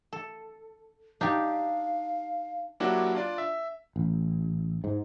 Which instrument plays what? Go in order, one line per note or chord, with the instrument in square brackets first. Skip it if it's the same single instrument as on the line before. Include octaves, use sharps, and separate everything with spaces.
[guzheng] A4
[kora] D4 [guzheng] D#4 G4 [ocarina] F5
[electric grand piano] F#3 A#3 D4 E4 F#4 G4
D4 F4 D5
E5
[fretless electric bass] A1
G#2